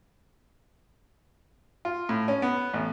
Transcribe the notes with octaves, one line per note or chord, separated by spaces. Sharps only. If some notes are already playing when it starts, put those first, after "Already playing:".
F4
A2
C#4
B3
A1